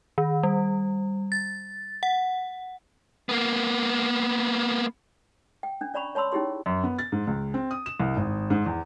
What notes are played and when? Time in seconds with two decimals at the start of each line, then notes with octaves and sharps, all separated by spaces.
0.18 D#3
0.43 G3
1.32 A6
2.03 F#5
3.29 A#3 B3
5.63 G5
5.81 C#4 D4
5.94 C#4 D5 A#5 B5 C#6
6.15 C#5 A5 B5 C6 E6
6.32 C#4 D#4 E4 G4 G#4 C6
6.66 F#2
6.84 B3
6.99 A6
7.12 G#2
7.27 C#2
7.54 C4
7.71 D#6
7.86 E7
8.00 C2
8.17 G#1
8.50 G#2
8.66 E2